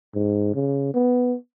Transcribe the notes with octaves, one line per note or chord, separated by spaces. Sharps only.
G#2
C#3
B3